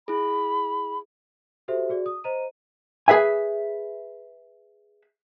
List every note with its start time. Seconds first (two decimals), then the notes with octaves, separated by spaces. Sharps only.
0.08 E4 G#4 B5
1.68 F#4 G4 A4 C5 E5
1.89 F#4 G#4 D5
2.06 D#6
2.24 C5 D#5 A#5 D#7
3.08 G#4 B4 E5 G#5